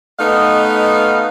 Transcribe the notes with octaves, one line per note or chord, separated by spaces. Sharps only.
A3 B3 D#4 D#5 F5